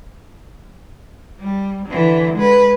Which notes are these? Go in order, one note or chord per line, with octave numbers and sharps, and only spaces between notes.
G3
D3 E3
G#3 B4